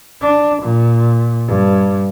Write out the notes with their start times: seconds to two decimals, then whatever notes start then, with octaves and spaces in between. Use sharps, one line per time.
0.22 D4
0.62 A#2
1.47 G2